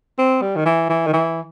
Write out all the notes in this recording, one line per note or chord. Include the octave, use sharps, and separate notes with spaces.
C4
G3
D#3
E3
E3
D#3
E3